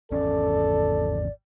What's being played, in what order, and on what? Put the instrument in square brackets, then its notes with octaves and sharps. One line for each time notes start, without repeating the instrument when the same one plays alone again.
[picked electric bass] G#1 E2 C#4 [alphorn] A4 [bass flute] D5